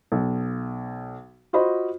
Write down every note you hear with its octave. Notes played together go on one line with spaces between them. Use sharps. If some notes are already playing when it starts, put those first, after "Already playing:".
B1
F4 F#4 C5 D#5 B5